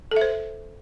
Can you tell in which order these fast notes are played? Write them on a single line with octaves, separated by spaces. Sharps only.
A4 E5 C5